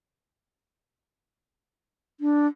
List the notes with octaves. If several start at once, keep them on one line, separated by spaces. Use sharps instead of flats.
D4